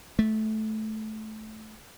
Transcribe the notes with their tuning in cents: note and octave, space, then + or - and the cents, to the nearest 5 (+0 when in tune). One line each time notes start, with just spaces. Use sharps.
A3 -15